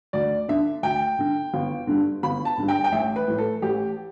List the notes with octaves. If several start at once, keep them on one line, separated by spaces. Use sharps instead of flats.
D2 D5
D3 E5
D2 G5
D3
G1
G2 D3
G1 B5
A5
G2 D3
G5
G5
A1 E5
B4
A2 E3
A4
A1 G4